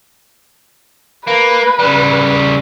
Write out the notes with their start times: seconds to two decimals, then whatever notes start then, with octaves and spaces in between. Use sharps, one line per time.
1.28 A#3 B4
1.80 C#3 G3